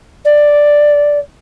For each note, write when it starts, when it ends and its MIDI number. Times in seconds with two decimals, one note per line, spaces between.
0.24 1.18 74